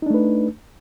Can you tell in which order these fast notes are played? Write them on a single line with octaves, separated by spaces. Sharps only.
D#4 D4 A3 B4